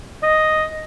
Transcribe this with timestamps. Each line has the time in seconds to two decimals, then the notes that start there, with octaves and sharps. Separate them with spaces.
0.22 D#5